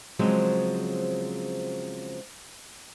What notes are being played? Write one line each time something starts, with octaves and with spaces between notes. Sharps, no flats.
C#3 F3 F#3 G#3 C4